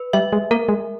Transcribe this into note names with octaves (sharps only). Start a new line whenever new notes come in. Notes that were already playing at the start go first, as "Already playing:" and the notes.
Already playing: B4
G3 E5
G#3
A#3 A#4
G#3